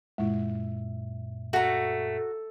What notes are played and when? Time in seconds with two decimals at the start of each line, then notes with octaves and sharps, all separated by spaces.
0.18 F#2 A#2 G#3 E4 E5
1.53 A3 F#4 A#5